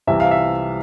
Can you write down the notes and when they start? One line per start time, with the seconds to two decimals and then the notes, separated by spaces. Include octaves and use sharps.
0.07 C2 C3 E3 G3 E5
0.20 F5
0.31 E5